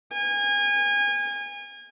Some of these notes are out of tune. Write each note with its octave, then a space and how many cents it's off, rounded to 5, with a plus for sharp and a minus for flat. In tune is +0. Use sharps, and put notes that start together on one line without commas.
G#5 -30